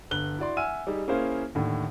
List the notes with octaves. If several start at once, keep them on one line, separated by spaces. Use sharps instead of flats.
G1 F#6 G7
E4 F#4 D5 C6
E5 F#5 G#5 E6 F6 D#7
G3 D#4 G4 G#4
A#3 C#4 E4 G#4 C5 F5
D#2 A2 D3